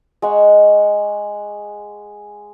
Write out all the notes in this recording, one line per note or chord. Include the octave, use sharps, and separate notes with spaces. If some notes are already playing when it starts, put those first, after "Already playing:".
G#3 F#5 C#6